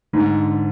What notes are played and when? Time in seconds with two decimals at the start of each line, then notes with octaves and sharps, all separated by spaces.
0.13 G#2 D3